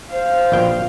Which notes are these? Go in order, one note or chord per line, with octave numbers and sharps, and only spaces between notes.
C5 F5
A#1 B2 G5